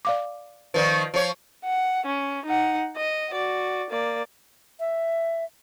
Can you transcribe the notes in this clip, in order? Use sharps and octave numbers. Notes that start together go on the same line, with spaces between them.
D5 F5 D6
D#3 F3 B4 D5
F3 C#5
F#5
C#4
D#4 F#5
D#5
F#4 D5
A#3 D5
E5